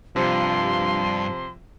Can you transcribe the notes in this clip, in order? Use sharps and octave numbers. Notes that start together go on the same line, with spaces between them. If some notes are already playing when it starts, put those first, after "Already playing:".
G2 C3 F3 C6